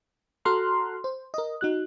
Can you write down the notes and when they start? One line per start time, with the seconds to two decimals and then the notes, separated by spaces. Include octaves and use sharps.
0.45 F#4 A4 A#5 C6 F6 F#6
1.04 C5
1.34 A#4 D#5
1.61 D#4 F#4 F#6